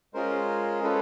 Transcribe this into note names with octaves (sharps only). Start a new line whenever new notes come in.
G#3 C#4 F4 G#4 A#4 C5
G#3 C#4 F4 G#4 A4 B4